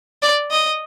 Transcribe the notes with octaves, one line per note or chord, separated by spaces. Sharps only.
D5
D#5